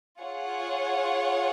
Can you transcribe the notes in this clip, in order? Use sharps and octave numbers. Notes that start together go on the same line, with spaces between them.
F4 G#4 C#5 F#5